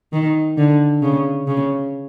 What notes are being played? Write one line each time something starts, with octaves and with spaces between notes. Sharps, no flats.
D#3
D3
C#3
C#3